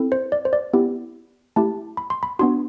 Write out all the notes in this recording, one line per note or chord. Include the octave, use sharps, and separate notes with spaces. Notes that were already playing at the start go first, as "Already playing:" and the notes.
Already playing: C4 E4 A4
C5
D5
C5
D5
B3 E4 G4
A3 E4 G4 A5
B5
C6
B5
B3 D4 F#4 C6